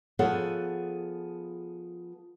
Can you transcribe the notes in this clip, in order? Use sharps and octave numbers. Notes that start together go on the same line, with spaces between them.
F3 B3 G#4 A4 C#5 F#5